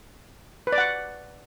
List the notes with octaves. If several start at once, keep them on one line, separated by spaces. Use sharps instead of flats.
B4
D5
F#5